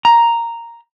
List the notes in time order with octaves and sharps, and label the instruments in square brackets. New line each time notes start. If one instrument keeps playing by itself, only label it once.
[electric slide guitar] A#5